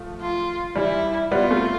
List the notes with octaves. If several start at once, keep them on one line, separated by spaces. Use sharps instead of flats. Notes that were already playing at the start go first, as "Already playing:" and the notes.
Already playing: F3 A3
F4
E3 G3 E4
G3 B3 F4
A3 C4